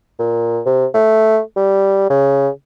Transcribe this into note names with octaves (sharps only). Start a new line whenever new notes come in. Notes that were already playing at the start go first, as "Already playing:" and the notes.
A#2
C3
A3
G3
C#3